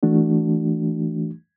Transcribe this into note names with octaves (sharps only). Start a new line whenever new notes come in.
E3 A3 D4 F#4